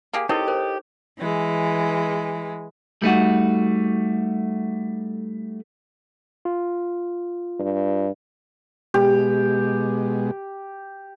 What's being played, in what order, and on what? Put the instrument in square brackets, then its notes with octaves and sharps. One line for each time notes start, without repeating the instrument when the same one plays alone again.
[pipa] A#3 G4 G#4
[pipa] C4 [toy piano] D#4 E4 A#4 [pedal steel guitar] G4 [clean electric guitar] A4 C#5 D#5
[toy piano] A#4 C5
[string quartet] E3 G#3
[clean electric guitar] G3 A3 D#4 F#4
[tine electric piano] F4
[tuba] G2
[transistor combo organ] B2 G#3 [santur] G4